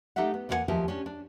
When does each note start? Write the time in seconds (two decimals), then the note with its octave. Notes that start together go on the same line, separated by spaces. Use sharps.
0.16 A3 D#4 G4 A4 E5 F#5
0.34 B3
0.49 E2 A#3 C4 F4 F#5 G#5
0.68 D#2 F3 G4 G#4 A#4 E5
0.88 C#4 D4 G4
1.06 D4